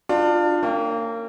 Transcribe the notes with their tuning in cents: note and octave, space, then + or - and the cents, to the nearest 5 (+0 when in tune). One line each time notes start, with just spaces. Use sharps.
D4 +25 F4 +5
A#3 -30 C#4 +0 G5 +0